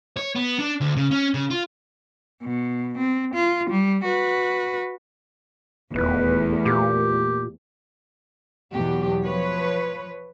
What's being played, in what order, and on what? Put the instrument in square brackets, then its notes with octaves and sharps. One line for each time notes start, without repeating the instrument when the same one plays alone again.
[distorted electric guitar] C#5
B3
D4
D2
C#3
C#4
C#3
F4
[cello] B2
C4
F4
G3
F#4 B4
[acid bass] D#1 [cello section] E2 A3 [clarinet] B4
[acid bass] A#2 [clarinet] G4
[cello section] E2 B2 F#3 G4
F3 B4 C#5